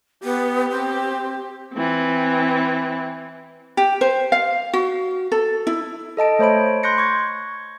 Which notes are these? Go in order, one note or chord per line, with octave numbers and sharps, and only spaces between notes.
B3 G4
C4
E3 C4
G4
C5
F5
F#4
A4
E4
A4 D#5 A5 D7
A3 C5 C#5 B5 D7
C6 F#6 G6 A#6 C#7
C#6 G#6